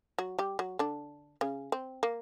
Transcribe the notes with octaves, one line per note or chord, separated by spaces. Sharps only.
F#3 F#4
G3 G4
F#3 F#4
D3 D4
C#3 C#4
C4
A#3